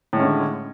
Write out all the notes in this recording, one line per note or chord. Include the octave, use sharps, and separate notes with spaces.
A2 D3 G#3 C#4